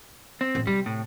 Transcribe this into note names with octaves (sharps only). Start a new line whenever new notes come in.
C4
A1
C3 G3
A2